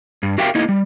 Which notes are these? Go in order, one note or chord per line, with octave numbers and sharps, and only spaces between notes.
G2
F#4 G4 A#4 E5 F5 G5
A#3 D#4 E4 D#5
G3